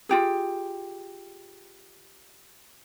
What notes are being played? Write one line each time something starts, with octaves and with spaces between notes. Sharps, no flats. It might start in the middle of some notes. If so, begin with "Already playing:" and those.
F4 G4 G#4